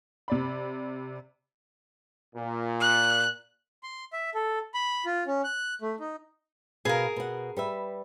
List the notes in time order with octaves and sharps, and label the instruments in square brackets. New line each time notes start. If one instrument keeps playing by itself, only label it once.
[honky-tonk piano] C3 D5 B5
[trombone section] A#2
[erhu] F#6
[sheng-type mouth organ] C6
E5
A4
B5
F4
C#4
F#6
A3
D#4
[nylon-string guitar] B2 F5 [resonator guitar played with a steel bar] G#4 A#4
[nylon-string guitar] B2 F#5
G3 B4 E5